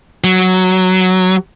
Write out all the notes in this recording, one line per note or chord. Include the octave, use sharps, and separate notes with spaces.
F#3